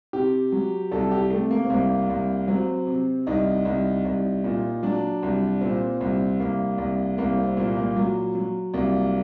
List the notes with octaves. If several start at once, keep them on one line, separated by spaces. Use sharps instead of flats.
C3 G4
F#3
C2 A4
G4
C3 A3
A#3
C4
C2 A#3
C2
F#3 C4
C3
C2 D#4
C2
C2
A#2
F#3 D4
C2
A#2 C4
C2
C2 A#3
C2
C2 A#3
C4
A#2 A#3
A#3
F#3
F#3
C2 A#3